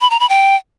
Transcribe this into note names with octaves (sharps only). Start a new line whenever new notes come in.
B5
A#5
B5
G5